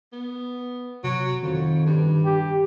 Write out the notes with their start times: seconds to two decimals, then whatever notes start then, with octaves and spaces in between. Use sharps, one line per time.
0.13 B3
1.04 C3 F#3
1.43 F2 D#3
1.87 G2
2.25 G4